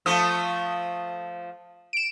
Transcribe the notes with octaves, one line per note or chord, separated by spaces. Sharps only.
F3 A3 A5 D#6
D7 E7